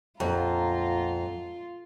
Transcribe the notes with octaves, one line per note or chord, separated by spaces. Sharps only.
A#1 F2 F4 F#5 A#5